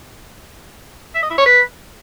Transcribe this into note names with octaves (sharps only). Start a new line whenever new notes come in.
E5
D#5
E4
C#5
B4